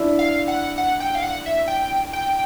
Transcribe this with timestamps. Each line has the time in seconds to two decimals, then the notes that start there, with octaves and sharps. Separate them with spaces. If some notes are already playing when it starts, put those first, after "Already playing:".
Already playing: D4 E4
0.19 F5
0.48 F#5
0.78 F#5
1.00 G5
1.15 F5
1.23 F#5
1.46 E5
1.68 G5
2.13 G5